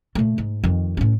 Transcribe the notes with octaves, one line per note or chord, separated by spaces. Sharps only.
A#2 A3
G#2
F2 D#3
A2 C#4